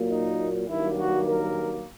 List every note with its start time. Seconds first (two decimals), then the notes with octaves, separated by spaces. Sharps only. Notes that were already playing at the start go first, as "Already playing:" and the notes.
Already playing: A#2 F#3 A#3
0.09 D#4
0.69 G2 D#3 F#3 A#3 E4
0.99 F#4
1.28 A#4